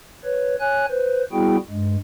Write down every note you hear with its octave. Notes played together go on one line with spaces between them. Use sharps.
B4 C#5
C#5 G#5 F#6
B4 C5
G3 B3 E4 F#4 G#4 G5
G2 G#3